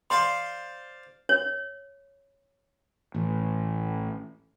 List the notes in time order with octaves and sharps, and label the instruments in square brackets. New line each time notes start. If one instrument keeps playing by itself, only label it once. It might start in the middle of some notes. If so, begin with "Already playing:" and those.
[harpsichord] C5 D5 F5 [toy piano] C6
[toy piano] C#5
[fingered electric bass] A1